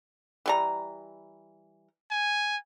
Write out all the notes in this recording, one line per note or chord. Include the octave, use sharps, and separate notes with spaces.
E3 G3 A#5
G#5